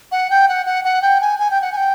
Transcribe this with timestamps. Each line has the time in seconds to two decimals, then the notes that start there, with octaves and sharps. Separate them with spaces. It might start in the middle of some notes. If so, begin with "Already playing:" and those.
0.12 F#5
0.30 G5
0.49 F#5
0.66 F#5
0.85 F#5
1.02 G5
1.21 G#5
1.39 G#5
1.51 G5
1.61 F#5
1.72 G#5
1.77 G5